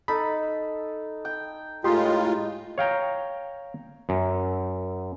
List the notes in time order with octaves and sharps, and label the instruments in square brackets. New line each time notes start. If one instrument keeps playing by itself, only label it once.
[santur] D#4 A4 [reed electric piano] B5
[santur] G5
[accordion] A2 G#3 F4 [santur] D#4 [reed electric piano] G4 C6
[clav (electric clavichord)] C#5 F5 G5 A#5
F#2